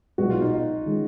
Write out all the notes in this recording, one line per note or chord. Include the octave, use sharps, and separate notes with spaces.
B1 A#2 G#3 B3 F#4
F4
D#4
F4
D#3 G#3 C#4